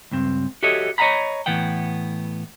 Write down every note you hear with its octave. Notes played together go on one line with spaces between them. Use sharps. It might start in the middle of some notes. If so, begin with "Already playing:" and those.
C#2 G2 C4
F#4 G4 A4 C#5 D#5 E5
C#5 D#5 F5 F#5 A#5 B5
A2 E3 B3 F#5 G5